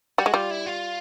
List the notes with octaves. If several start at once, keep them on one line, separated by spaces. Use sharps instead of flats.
G3 F#4
G#3
G3 F4
E4
F4